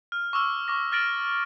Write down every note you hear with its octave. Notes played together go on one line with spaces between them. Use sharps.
F6
C#6 D6 E6 F6
C#6 D6 A#6
E6 F6 A6 A#6 D7 F#7